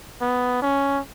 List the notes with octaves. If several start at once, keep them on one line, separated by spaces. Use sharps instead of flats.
B3
C#4